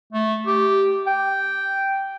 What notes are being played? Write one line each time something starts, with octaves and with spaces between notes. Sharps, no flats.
A3
G4
G5